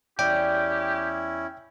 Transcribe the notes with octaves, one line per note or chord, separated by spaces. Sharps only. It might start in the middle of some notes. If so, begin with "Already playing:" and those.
E2 C#4 E4 G4 D5 G5